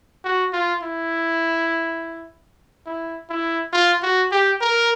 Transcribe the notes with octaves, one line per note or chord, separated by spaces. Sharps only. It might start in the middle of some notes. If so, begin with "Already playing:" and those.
F#4
F4
E4
E4
E4
F4
F#4
G4
A#4